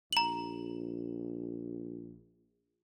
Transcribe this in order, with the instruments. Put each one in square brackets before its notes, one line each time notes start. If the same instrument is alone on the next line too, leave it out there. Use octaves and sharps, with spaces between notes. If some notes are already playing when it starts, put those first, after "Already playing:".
[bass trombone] A#1 [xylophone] A#5 F#7